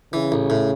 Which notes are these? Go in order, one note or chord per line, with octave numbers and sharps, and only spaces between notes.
C#3 E3
A1
A2